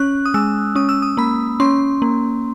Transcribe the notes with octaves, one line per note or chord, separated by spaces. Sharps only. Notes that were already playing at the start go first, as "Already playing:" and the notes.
Already playing: C#4 F#6
D#6
G#3 E6
C#4 D#6
E6
D#6
A#3 B5
C#4 C6
A#3